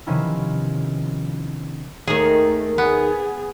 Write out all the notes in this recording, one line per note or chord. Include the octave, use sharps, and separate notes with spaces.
C3 D#3 F3 B3 C#4 E4
D#2 D#3 A3 G#4
B3 G#4